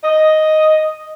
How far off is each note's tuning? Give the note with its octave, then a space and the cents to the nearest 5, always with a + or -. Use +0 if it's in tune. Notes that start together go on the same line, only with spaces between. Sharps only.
D#5 +0